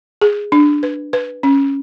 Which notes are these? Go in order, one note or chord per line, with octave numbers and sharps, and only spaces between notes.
G#4
D4
B4
B4
C#4